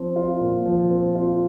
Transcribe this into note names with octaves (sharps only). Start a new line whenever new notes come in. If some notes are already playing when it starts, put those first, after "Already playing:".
Already playing: F3 C4
F4
A#2
F3
C4
F4